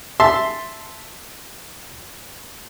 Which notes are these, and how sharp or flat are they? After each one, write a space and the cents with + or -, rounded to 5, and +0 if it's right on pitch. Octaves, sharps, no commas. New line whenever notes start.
E5 +0 A5 +0 C6 +0